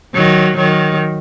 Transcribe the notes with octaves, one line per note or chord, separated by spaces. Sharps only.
D#3 F#3
D#3 F#3